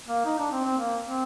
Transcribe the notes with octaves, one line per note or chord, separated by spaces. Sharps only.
A#3
D#4
D4
C4
C4
A#3
C4